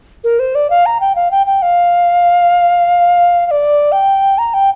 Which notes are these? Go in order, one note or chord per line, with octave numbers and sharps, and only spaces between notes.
A#4
C5
D5
F5
A#5
G5
F5
G5
G5
F5
F5
D5
G5
A#5
G5